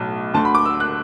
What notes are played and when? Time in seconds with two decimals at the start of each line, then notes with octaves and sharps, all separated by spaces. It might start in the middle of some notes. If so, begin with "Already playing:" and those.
Already playing: B1 A2
0.34 D2 D3 A5
0.45 B5
0.55 D6
0.65 E6
0.80 F#6